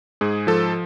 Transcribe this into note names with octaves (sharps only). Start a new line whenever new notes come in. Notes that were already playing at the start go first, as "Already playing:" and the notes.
G#2 G#4
F3 A4